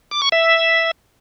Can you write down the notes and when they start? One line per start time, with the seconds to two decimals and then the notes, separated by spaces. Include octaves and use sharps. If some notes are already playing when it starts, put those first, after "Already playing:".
0.11 D6
0.22 C#6
0.32 E5